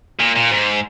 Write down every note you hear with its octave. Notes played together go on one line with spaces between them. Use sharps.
A#2
A#2
G#2